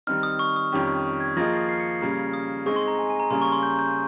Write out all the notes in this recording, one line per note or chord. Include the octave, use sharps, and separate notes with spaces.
D#3 G3 C4 D#4 F6
D#6
C#6
D#6
F2 D#3 G3 C#4 G4
G#6
F3 A#3 F4 G#4 D#5 A#6
C7
C7
C#7
C7
C#3 G3 A#3 C7
G#6
D#6
G#3 C4 D#4 G#4 D#5 C#6
C6
A#5
G#5
G#5
A#5
C#3 G3 A#3 C6
C#6
C6
G6
G6